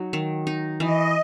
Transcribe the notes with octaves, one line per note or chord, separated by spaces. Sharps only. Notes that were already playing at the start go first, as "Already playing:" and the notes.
Already playing: F#3 D#4
D#3
D#4
E3 D#5